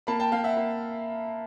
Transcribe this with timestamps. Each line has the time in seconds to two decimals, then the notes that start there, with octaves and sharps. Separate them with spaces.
0.07 A#3 A5 B5
0.20 G5 A5
0.32 A#3 F5 G5
0.44 E5 F#5
0.57 A#3